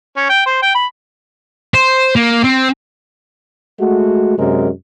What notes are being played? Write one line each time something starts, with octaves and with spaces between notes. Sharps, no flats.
C#4
G5
C5
G5
B5
C5
A#3
C4
G#3 A3 F#4
F#2 C3 G#3 A#4